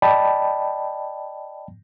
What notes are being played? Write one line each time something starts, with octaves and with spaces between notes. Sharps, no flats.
D5 D#5 G5 A5 B5